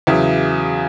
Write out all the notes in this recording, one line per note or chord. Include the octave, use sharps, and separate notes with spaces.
E2 C#3 F#3 E4